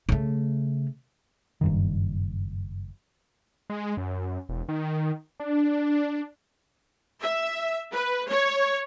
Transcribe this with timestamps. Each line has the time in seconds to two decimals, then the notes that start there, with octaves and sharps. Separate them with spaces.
0.09 C#3 A3
1.61 F#1 G2 D#3
3.70 G#3
3.97 F#2
4.49 E1
4.69 D#3
5.40 D4
7.21 E5
7.93 B4
8.28 C#5